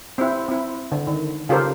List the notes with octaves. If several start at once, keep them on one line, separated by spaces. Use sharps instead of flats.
C4 E4
C4 E4
D3
D#3
C#3 F4 G4 A4 A#4 C5